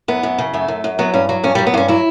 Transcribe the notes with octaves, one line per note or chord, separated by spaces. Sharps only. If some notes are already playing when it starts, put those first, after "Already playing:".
F#2 B3
F#2
C#3
F#2 A3
F#2
F#2
F#3 B3
G2 C#4
F#3
G2 C#4
G3
F#3
B3
G2 C#4
F#3 E4